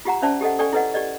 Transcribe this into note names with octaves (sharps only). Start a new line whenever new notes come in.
F4 G4 F#5 A#5
C#4 C5 D5 E5 A5
G4 A4 D#5 F#5
A4 D5 G5 G#5 C#6
E4 A4 B4 C#5 D#5 F#5
G4 D5 D#5